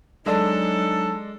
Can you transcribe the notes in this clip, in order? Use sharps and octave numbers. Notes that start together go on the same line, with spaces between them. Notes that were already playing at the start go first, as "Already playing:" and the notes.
F#3 G#3 D4 D#4 A4 D5